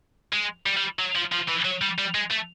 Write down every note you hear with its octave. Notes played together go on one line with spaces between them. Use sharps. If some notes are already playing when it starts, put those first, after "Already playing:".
G#3
G3
G3
F#3
F3
F3
E3
F#3
G3
G3
G#3
A3